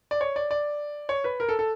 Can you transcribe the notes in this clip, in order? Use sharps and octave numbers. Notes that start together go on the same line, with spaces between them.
D5
C#5
D5
D5
C#5
B4
A#4
A4
A4